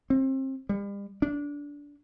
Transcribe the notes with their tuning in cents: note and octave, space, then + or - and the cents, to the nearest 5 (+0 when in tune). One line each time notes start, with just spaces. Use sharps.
C4 +30
G3 +40
D4 -20